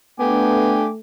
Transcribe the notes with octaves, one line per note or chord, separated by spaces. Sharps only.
A3 B3 D4 G5 G#5 D6